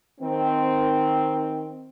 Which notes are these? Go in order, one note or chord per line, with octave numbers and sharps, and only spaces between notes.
D#3 C4